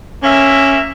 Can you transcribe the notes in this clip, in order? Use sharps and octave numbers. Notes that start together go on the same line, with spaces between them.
A#3 C#4 E5